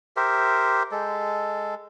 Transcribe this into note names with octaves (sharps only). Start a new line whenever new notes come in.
G4 A#4 C5 E5
G#3 A4